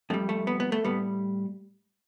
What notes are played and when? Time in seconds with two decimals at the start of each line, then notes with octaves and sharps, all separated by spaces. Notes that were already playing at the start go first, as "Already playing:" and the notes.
0.10 F2 E3 G3 A3
0.29 A3
0.47 B3
0.60 B3
0.72 A3
0.84 A2 G3 B3